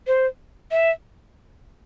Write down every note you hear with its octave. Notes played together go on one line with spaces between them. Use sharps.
C5
E5